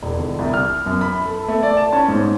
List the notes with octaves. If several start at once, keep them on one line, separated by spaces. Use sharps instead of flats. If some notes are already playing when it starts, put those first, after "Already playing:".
E1
D3
C2
F6
F#2
B5
A4
A3
D5
A5
C#4
G#2